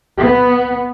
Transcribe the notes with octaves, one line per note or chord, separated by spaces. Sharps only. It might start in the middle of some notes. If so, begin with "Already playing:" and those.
B3